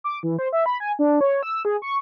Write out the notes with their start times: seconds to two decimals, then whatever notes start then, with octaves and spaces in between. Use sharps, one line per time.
0.04 D6
0.23 E3
0.39 C5
0.53 E5
0.66 B5
0.80 G#5
0.99 D4
1.21 C#5
1.43 E6
1.65 G#4
1.82 C#6